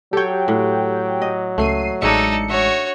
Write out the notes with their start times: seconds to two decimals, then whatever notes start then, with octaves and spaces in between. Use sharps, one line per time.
0.13 F#3 G4 A4 C#5 G5
0.48 A2
1.22 D#5
1.58 C#2 A3 C7 D#7
2.02 A1 G#3 D4 D#4 A4 C#5 E5 C#7
2.50 F#4 C#5 E5